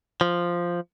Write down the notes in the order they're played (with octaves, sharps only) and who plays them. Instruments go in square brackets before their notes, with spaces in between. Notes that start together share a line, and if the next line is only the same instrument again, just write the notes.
[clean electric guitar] F3